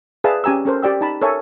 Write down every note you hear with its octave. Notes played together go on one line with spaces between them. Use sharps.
G#4 B4 D5 E5 F5 A5
C#4 G4 G#5 A#5 E6
C#4 A4 A#4 C5
G4 D5 G5 E6
D#4 A5 B5
A4 A#4 C#5 E5 G#5